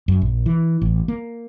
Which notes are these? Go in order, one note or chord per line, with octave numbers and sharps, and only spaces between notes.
F#2
A#1
E3
A1
A#3